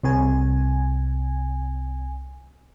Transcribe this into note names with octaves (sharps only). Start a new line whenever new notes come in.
C2 C3 G#5